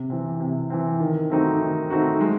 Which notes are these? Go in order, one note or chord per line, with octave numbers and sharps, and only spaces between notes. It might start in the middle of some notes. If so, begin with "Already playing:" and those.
Already playing: C3
E3 C4
C3
E3 C4
D#3
A3 C4 D#4 F#4
D#3
A3 C4 D#4 F#4
G#3